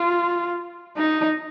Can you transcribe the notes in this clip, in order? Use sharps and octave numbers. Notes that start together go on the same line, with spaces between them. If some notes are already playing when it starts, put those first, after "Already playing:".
Already playing: F4
D#4